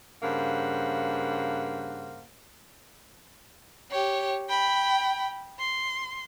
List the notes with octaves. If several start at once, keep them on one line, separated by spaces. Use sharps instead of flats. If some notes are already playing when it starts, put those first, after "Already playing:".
G2 C#3 A#3 C5 F#5
G4 C#5
G5 B5
C6